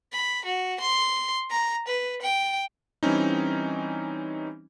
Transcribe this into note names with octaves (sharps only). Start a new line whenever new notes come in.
B5
F#4
C6
A#5
B4
G5
E3 G3 C4 C#4 D#4